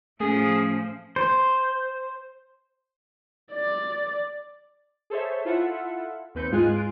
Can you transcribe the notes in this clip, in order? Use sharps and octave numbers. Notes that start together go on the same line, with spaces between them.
A2 F3 A3 C#4 G#4
C5
D5
G#4 A4 C5 C#5 E5
E4 F4 A4 E5 F#5
D#2 C4 B4 G6 C#7
G#2 G#3 F4 G#4 G#5 F#6
F4 D7